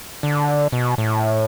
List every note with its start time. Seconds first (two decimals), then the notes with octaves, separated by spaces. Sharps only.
0.23 D3
0.73 B2
0.98 A2